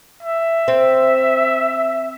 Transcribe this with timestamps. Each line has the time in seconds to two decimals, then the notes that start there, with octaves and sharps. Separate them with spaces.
0.23 E5
0.68 C4